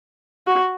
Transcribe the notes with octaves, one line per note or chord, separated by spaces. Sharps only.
F#4